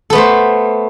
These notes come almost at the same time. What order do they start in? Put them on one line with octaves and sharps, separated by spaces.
A4 B3 A3 C5